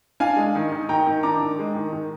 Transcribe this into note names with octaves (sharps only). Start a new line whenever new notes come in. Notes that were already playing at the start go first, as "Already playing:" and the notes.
D4 F5 G#5
G#3
D#3
D#3
D#3 G5 A#5
D#3
D4 A#5 D6
D#3
G#3
D#3
D#3